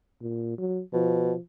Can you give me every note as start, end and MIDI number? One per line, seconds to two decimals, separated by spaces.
0.22 0.54 46
0.58 0.81 54
0.93 1.33 47
0.93 1.40 53